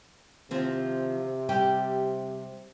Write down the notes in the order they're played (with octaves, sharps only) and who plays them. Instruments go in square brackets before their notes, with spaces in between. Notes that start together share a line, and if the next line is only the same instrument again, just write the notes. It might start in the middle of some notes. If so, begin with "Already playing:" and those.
[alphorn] C3 [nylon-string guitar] D#3 F3 C4
[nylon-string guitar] G3 G4 G5